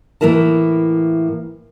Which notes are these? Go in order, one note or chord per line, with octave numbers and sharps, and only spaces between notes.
A2 E3 A#3 E4 A#4 A5